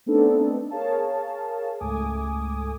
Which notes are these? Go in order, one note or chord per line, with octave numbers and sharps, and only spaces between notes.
A3 B3 C4 D4 D#4 A4
G#4 A#4 C#5 F5 A5
C#2 G#2 A3 G#5 D6 D#6